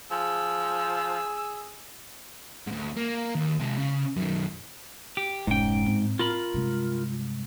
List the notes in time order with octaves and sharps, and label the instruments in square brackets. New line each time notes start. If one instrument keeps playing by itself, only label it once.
[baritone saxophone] F3 [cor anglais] G#4 [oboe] E6
[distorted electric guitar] D2 G#2
A#3
D#2
C3 G#3
C#3
F#2 D#3
[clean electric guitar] G4
[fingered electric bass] F1 C#4 [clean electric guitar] G#2 G5
[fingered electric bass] A2 C4
[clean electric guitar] F4 A#4 B5
[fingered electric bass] G2 C3 G#3